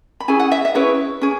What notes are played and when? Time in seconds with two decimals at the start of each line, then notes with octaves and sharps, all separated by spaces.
0.20 B5
0.28 C#4 E4 G#4 G#5
0.40 F#5
0.51 E5
0.65 E5
0.75 C#4 E4 G#4 B4 C#5
1.21 C#4 G#4